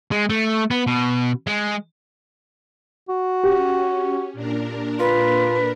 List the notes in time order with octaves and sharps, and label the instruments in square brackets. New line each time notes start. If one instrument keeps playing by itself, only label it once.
[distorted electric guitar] G#3
A3
B3
B2
G#3
[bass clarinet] F#4
[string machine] C#4 [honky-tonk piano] G4
[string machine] A#2 D4 A#4
[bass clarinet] F4 [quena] B4